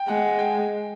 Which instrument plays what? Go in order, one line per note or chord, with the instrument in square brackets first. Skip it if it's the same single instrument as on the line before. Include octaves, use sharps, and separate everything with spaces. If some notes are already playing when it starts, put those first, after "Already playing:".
Already playing: [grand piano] G5
[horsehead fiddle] G#3 [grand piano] F#5
[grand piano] G5